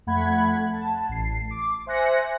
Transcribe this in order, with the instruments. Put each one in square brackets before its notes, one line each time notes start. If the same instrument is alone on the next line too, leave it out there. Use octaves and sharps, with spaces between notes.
[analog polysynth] F2 A3 F#5 B5 G#6
A5
A1 C7
D6
C5 E5 G#5 F#6 A#6 C#7